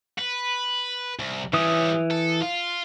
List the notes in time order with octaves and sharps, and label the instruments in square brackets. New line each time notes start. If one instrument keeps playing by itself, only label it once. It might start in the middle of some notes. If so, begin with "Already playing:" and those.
[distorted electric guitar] B4
C2
[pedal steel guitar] E3 D#6 [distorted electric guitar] G3 C#4
[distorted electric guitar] A4
F4